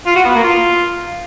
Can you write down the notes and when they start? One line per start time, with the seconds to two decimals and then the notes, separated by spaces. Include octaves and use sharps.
0.06 F4
0.16 F#4
0.25 B3
0.35 A#3
0.44 F4